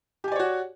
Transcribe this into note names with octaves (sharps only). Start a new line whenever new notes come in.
F#4 G4 C#5 D5 G#5